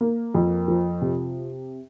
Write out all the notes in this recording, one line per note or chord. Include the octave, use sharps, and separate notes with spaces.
A#3
F2
F3
C3